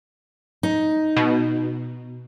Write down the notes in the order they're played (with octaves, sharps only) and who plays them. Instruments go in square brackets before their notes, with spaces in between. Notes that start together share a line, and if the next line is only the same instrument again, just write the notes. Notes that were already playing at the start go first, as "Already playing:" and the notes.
[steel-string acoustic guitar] D#4
[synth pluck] B2